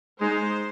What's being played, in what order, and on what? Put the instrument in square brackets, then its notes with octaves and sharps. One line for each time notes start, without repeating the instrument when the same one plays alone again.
[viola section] G#3 D#4 C5